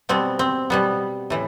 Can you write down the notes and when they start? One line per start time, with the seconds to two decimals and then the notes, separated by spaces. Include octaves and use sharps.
0.09 B2 G3 B3 C4
0.39 C4
0.70 B2 G3 B3
1.30 A2 E3